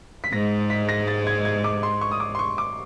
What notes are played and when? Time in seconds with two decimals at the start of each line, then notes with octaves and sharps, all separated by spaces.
0.24 B6
0.32 G#2 G#3 A#6
0.70 B6
0.89 A#6
1.08 A6
1.27 G#6
1.45 G#6
1.64 D6
1.83 C6
2.01 C#6
2.11 D#6
2.20 D6
2.35 C6
2.39 C#6
2.58 D6